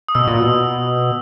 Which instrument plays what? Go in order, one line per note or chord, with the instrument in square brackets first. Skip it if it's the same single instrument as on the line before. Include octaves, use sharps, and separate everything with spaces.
[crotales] D#6
[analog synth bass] B2 [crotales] E6
[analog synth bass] A#2
B2